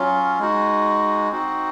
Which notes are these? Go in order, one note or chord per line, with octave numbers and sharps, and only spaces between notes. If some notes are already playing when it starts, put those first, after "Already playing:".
Already playing: F#3 C#4 F4
G#3 D#4 F#4
C4 D#4 F#4